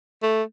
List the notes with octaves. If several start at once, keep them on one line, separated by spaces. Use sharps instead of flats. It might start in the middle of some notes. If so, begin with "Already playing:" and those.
A3